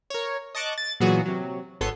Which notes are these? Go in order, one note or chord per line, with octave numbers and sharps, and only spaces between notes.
A#4 C#5
D#5 A5 C#6 D6 F#6
A6
A#2 E3 F#3 B3 F#4 G#4
C3 F#3
G#1 B3 A4 C#5 C6